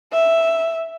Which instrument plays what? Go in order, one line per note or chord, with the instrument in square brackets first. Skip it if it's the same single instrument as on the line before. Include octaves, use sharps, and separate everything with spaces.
[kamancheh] E5